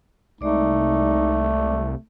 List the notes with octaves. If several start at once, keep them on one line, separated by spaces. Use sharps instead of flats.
C2 G#3 A3 D#4 D5 D6